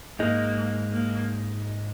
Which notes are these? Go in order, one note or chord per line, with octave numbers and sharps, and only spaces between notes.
G#2 G#3 A#3 D#4
A#3